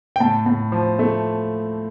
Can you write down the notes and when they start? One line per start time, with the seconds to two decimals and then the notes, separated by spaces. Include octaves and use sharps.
0.16 G5
0.20 A2 A5
0.46 A2
0.72 F3
0.99 A3